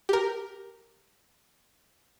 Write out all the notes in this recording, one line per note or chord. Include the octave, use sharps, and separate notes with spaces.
G4 A#4